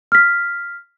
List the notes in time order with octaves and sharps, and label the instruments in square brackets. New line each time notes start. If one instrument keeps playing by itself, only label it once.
[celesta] F6 B6